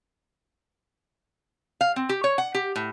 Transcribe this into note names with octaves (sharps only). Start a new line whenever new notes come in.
F5
C4
G4
C#5
F#5
G4
A2